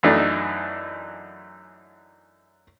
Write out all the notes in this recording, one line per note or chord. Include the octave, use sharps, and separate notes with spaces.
F#2 E3 F#3 A3 D4 D#4